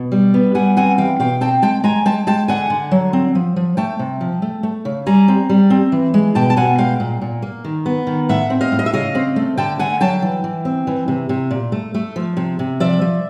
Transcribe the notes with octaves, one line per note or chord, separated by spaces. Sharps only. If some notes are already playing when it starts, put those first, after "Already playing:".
Already playing: B2
G3
B3
G3 F#5 G#5
C4 F#5 G#5
E3 F5 G5
B2 F5 G5
C4 G5 A5
G#3 G5 A5
G#3 G#5 A#5
G#3 G5 A5
G#3 G5 A5
D3 F#5 G#5
D3
F#3
C4
F3
F3
A3 G5 A5
C3
F3
A3
A3
C#3
G3 G#5 A#5
C4
G3
C4
E3
G#3
B2 G5 A5
A5
B2 F#5 G#5
G#3 F5 G5
A#2
A#2
A#3
D#3
B3
D#3
A2 E5 F#5
C4
D#5 F5
A2
D#5
E5
C#3 D#5 F5
C4
A3
D3 G5 A5
D3 F#5 G#5
F#3 G5 A5
E3
E3
C4
E3
C3
C3
A#2
A3
A3
F3
C3
C3
F3 D5 E5
F3